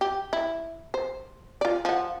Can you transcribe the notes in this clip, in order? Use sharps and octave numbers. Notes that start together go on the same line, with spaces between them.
G4
E4
C5
F4 D5
F3 F#5